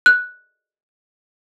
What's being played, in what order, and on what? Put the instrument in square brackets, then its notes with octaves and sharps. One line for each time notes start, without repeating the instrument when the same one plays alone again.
[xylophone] F#6